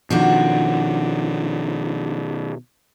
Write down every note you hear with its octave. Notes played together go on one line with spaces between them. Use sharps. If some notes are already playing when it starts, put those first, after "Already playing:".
B2 D#3 F3 D4 F#4